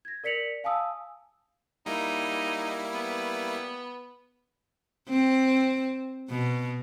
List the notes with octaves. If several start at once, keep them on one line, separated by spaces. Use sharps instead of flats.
G#6 A#6
A#4 D5 B6 C#7 F7 F#7
F5 G#5 A5 D#6 E6
G3 A#3 D#4 E4
B3
C4
B2